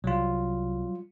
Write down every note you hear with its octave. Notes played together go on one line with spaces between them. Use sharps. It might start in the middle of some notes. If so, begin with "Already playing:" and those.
C2 F#3 G3 F4